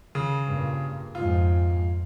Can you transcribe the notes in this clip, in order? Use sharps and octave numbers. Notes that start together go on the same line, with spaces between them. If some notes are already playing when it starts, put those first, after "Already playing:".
C#3
G2 A#2
F2 G#2 F4